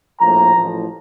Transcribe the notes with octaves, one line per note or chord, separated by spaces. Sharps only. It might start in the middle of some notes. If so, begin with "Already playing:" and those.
A#1 A2 F3 A#3 A#5
A1 A2 F3